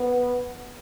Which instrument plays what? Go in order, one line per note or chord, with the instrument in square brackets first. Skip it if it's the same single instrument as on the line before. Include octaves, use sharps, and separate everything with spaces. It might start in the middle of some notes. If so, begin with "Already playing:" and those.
Already playing: [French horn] B3